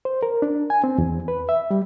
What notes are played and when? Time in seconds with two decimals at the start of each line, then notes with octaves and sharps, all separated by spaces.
0.05 C5
0.23 A#4
0.42 D4
0.70 G#5
0.84 C4
0.98 E2
1.28 B4
1.49 E5
1.71 G3